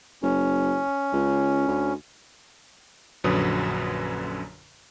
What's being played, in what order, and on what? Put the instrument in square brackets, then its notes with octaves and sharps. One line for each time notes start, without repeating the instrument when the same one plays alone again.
[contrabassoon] F#1 [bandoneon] C#4
[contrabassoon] C#2
D2
[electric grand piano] A#1 F#2 D3 F#3 B4 D#6